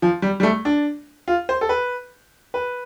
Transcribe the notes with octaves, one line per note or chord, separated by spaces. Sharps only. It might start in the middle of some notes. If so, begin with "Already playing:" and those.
F3
G3
G3
A3
D4
F4
C5
A4
B4
B4